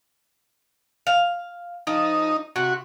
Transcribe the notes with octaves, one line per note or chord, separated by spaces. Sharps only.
F5
F3 D#4
C3 F#4